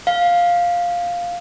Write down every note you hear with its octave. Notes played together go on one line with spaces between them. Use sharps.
F5